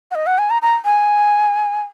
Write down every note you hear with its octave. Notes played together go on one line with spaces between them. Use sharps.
F#5
D#5
F#5
G#5
A#5
A#5
G#5